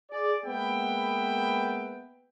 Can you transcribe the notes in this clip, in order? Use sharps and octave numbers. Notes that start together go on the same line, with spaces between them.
G#4 D5
G#3 A#3 B3 B4 E5 G5